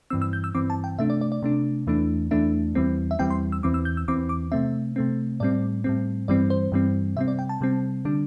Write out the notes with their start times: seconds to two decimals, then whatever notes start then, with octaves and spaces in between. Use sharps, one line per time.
0.10 G2 E3 C4 E6
0.22 E6
0.33 G6
0.44 E6
0.55 G2 E3 C4 D6
0.70 A5
0.84 G5
0.98 C3 A3 D4 E5
1.10 D5
1.21 D5
1.32 D5
1.42 C3 A3 D4
1.87 E2 E3 A3 D4
2.31 E2 E3 A3 D4 E5
2.75 E2 E3 G3 C4
3.11 E5
3.19 E2 E3 G3 C4 G5
3.30 C6
3.52 E6
3.63 E2 E3 C4 D6
3.74 E6
3.85 G6
3.97 E6
4.08 E2 E3 C4 D6
4.29 D6
4.52 C3 A3 C4 E5
4.96 C3 A3 C4
5.40 A2 G3 C4 D5
5.84 A2 G3 C4
6.28 G2 E3 G3 C4 D5
6.50 C5
6.72 G2 E3 G3 C4
7.16 C3 G3 C4 E5
7.28 D5
7.39 G5
7.49 A5
7.61 C3 G3 C4
8.05 D3 G3 D4